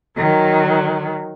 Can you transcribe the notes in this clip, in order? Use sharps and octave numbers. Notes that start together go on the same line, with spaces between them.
D#3 F#3